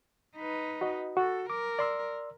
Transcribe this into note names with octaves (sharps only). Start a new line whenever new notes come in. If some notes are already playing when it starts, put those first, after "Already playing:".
D#4 B4
F#4 D#5
F#4 A4
A#4 D6
D5 C6 E6